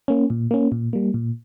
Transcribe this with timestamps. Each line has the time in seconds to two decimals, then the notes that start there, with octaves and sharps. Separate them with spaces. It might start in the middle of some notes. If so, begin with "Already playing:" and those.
0.08 A#3 C#4
0.30 A#2
0.51 A#3 C#4
0.72 A#2
0.93 G3 A#3
1.14 A#2